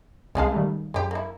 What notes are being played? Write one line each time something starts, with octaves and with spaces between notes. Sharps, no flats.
C2 C#3 G#3 G#4 F5 A5
D#3 G3 A3
F#2 G#3 G4
A#3 E4